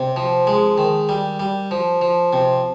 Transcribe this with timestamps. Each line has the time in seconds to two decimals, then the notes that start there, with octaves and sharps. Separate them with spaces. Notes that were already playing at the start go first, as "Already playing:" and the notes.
Already playing: C3
0.16 F3
0.47 G#3
0.78 D#3
1.09 G3
1.40 G3
1.71 F3
2.01 F3
2.33 C3